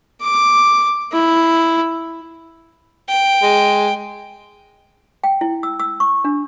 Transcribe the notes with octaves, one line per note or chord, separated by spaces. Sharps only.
D6
E4
G5
G#3
G5
E4
E6
E6
C#6
D4